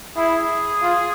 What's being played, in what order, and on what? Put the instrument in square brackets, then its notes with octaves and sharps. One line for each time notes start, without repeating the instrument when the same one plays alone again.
[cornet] E4 [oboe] G#4
[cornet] F4